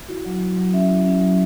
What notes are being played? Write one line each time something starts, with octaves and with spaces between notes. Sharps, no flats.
E4 F#4
F#3
F#3
F#3
C#4 E5
E4
C#4
F#3